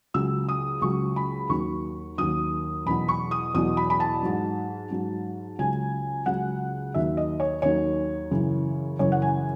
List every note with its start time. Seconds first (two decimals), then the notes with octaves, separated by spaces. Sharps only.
0.14 C#2 C#3 F#3 E6
0.49 D#6
0.81 C#2 C#3 F#3 C#6
1.16 B5
1.49 D#2 D#3 F#3 C#6
2.18 D#2 D#3 F#3 D#6
2.86 E2 B2 F#3 B5
3.08 C#6
3.31 D#6
3.54 E2 B2 F#3 D#6
3.77 B5
3.90 B5
4.00 A5
4.23 G#2 F#3
4.91 G#2 F#3
5.59 C#2 C#3 F#3 G#5
6.26 C#2 C#3 F#3 F#5
6.94 D#2 D#3 F#3 E5
7.17 D#5
7.40 C#5
7.62 D#2 D#3 F#3 C#5
8.31 F#2 C#3 E3
8.99 F#2 C#3 E3 C#5
9.12 F#5
9.22 G#5